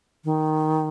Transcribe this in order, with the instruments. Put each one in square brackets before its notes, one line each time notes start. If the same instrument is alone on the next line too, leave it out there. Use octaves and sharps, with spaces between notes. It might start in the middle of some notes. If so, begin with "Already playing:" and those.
[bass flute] D#3